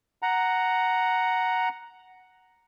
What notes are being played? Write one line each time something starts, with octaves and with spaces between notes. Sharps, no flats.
F#5 A#5